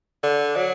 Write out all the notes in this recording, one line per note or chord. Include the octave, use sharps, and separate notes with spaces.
D3
F#3